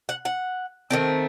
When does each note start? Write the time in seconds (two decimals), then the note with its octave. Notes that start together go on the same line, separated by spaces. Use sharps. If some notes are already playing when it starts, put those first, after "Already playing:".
0.09 F#5
0.25 F#5
0.90 D#3 A3 C4